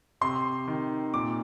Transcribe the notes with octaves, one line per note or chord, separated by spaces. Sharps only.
C3 C6
D#3
A#2 D6